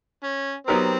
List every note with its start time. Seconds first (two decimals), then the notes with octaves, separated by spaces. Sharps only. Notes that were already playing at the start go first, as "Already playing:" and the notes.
0.24 C#4
0.67 F#3 B3 C4 D#4 G4 A#4